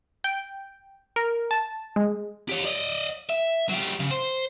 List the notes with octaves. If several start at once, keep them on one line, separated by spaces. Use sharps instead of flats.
G5
A#4
A5
G#3
G4 C#5
D5 D#5
E5
F#3 G4
C#3
C5